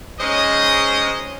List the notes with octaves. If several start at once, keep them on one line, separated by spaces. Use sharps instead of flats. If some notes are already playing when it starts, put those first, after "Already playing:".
G#3 C#4 D#4 C5 D#5